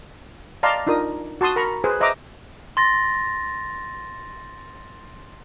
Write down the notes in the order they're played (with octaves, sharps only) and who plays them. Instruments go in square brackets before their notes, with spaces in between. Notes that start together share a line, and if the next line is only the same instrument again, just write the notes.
[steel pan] D5 D#5 F5 A5 A#5 C6
D4 D#4 F4 A#4 D#6
F#4 A5 C6 D#6
A#4 A#5 B5 C#6
G#4 B4 C5
C5 D#5 E5 A#5 D6
[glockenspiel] C6 A6 A#6